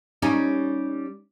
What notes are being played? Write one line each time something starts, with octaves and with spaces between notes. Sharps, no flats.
G3 C#4 D#4